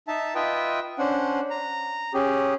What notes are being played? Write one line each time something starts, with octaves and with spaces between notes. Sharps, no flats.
D#4 E5 A5
F4 B4 D#5 E5 G5
C#4 D4 C5 F#5
A#5
C#4 G4 G#4